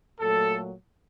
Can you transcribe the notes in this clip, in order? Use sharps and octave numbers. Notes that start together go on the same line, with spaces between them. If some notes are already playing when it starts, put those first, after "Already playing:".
A#2 F#3 A3 A4